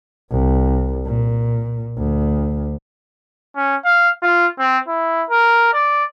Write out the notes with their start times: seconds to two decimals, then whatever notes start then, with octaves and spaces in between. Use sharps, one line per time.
0.31 C2
1.06 A#2
1.97 D2
3.55 C#4
3.85 F5
4.23 F4
4.59 C4
4.88 E4
5.30 A#4
5.74 D5